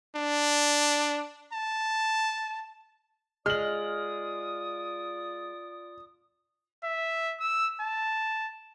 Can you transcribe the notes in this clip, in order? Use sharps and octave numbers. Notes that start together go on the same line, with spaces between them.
D4
A5
G#3 F4 D5 D#6 F6 F#7
E5
E6
A5